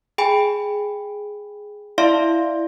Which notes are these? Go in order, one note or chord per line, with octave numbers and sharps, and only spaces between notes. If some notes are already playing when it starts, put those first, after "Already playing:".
G#4 G5 G#5 B5
E4 D5 E5 F5 C6